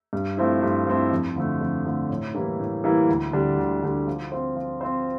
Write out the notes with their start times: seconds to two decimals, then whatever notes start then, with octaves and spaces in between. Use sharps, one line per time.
0.13 G2
0.37 F3 A3 C4 E4
0.62 G2
0.87 F3 A3 C4 E4
1.11 F2
1.36 D3 F3 A3
1.61 F2
1.86 D3 F3 A3
2.10 A2
2.35 E3 G3 A#3 E4
2.59 A2
2.84 E3 G3 A#3 E4
3.09 D2
3.33 D3 G3 D4
3.58 D2
3.82 D3 G3 D4
4.07 F3
4.32 C4 F4 C5
4.56 F3
4.81 C4 F4 C5